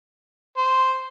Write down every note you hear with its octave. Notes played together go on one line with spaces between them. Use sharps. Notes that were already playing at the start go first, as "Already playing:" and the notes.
C5